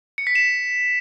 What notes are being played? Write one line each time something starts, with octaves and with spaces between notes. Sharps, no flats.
C#7
B6
E7